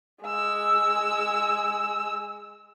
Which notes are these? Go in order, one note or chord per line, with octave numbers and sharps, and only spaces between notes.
G#3 E6